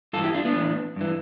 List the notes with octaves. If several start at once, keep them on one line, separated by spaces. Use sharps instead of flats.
G2 E3 F4 A4
E4 G4
D4 F4
B3 D4
A2 E3
G2 E3